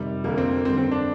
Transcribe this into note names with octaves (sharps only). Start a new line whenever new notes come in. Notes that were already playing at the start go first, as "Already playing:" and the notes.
Already playing: F2 C3 D#3 G3
F2 D3 A#3
C4
A#3
G2 D3 C4
C4
D4